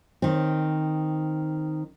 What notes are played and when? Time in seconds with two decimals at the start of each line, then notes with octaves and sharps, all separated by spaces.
0.22 D#3 C4